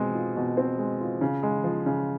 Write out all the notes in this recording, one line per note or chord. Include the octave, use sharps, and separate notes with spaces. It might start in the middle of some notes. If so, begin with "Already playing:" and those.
Already playing: B2 G#3 C4
F4
B2
C4
G#3
F4
C#3
G#3
F3
C#3